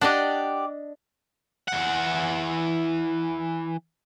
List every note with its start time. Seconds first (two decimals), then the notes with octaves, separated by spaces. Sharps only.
0.01 D4 G4 D5 D#5 F#5
1.68 E3 F#5